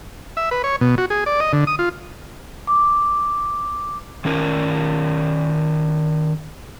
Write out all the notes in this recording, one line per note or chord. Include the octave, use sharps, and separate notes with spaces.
E5
B4
C#5
B2
F#4
G#4
D5
D#5
D3
D#6
F4
D6
D#3 C#4 A#4